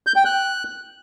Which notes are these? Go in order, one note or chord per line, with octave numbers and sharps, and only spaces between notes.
G6
G5
F#6